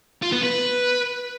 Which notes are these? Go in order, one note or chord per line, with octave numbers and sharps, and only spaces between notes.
F4
B3
B4